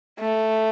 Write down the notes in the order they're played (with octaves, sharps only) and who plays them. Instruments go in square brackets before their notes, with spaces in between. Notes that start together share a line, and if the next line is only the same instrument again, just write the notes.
[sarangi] A3